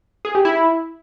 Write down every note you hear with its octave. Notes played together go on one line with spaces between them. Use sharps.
G#4
G4
E4